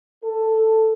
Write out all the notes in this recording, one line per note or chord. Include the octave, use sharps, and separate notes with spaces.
A4